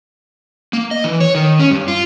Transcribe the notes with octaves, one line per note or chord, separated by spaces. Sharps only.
A#3
D#5
E3
C#5
D#3
C#4
G2
F4